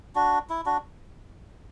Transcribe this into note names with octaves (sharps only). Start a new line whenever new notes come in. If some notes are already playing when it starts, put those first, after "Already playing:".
D4 F#4
E4
D4 F#4